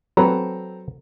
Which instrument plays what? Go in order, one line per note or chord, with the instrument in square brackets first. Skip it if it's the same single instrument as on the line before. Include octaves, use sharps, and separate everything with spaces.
[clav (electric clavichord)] F#3 B4 [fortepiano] C4 A4 A#5